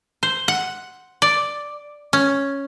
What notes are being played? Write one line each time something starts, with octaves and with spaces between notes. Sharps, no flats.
C5
F#5
D5
C#4